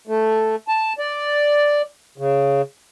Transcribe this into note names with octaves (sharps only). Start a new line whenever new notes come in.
A3
A5
D5
C#3